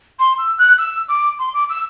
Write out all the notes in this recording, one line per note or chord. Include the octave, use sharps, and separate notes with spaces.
C6
E6
F#6
E6
D6
C6
D6
E6